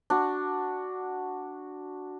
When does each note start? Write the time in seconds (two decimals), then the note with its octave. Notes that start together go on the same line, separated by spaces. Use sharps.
0.10 D4 F#4